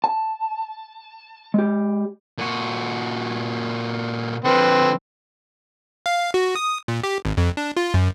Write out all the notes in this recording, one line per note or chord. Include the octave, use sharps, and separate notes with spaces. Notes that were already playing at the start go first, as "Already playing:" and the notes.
A5
G#3 G4
A#2 F#4
D3 F3 C4 B4
F5
F#4
D#6
A#2
G4
G#1
F2
D4
F4
F#2